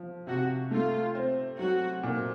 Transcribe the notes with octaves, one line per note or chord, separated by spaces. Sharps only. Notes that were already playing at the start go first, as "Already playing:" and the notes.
Already playing: F3
C3 F#4
A3 F4
C4
F#3 F#4
A#2